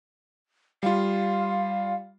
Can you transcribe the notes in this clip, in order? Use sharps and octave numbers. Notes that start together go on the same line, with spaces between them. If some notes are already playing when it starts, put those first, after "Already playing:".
G3 F4 F5